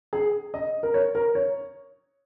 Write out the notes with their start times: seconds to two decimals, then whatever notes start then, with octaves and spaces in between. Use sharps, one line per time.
0.13 G#4
0.54 D#5
0.83 A#4
0.94 C#5
1.15 A#4
1.35 C#5